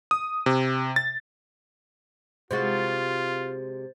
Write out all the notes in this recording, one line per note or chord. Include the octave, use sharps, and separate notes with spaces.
D#6
C3
A6
C3 G#3 F4 F#4 C5 A6